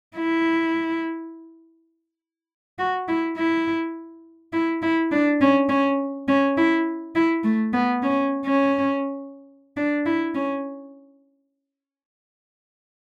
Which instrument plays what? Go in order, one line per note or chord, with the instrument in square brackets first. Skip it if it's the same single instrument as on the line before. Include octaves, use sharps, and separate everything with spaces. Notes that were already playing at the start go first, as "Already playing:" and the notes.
[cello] E4
F#4
E4
E4
E4
E4
D4
C#4
C#4
C#4
E4
E4
A3
B3
C#4
C#4
D4
E4
C#4